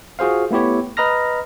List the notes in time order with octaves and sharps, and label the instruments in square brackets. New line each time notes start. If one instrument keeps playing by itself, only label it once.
[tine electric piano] F4 F#4 G#4 C5 F5
A3 B3 E4 G4 C#5
B4 D#5 A#5 B5 F6 A#6